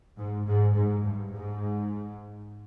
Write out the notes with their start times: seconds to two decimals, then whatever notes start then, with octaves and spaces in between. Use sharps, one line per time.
0.18 G#2
0.46 G#2
0.75 G#2
1.04 G2
1.33 G#2